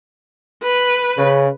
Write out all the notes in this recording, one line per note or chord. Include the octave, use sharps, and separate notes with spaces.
B4
C#3